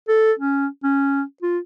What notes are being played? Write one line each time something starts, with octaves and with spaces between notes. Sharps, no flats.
A4
C#4
C#4
F4